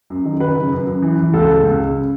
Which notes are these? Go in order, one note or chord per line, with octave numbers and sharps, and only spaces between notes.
F#2
D#3
F#2 B4
C#3
F#2
F#2
E3
E3
C#2 A4
C#3
C#2
C#3